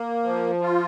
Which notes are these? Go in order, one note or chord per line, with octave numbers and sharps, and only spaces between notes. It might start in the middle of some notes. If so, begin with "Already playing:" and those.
Already playing: A#3
F3
F4